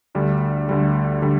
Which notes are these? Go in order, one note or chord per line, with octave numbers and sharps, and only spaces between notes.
D2 D3 G3
D2 D3 G3
D3 G3